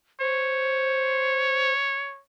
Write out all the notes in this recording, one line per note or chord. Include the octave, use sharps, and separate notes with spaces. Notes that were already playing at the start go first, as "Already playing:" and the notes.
C5 C#5